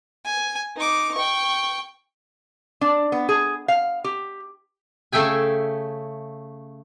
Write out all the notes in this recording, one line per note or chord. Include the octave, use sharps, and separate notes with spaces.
G#5
D#4 D6
G5 C#6
D4
B3
G#4
F5
G4
C#3 A3 E5 G5 G#5